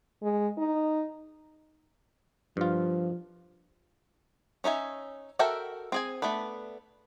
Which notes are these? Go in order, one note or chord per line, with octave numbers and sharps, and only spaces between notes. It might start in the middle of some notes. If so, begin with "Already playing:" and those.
G#3
D#4
G2 F3 F4
C#4 D#4 E5 G#5
F#4 A4 A#4 E5 G5
C4 G#4 G#5
A3 B3 D4 B4